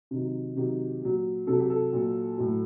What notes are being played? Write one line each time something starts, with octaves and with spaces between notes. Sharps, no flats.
C3 D#3 F#3
C3 D#3 F#3 G4
A#2 F#3
C3 F#3 A4
G4
A4
A#2 F#3
A2 F#3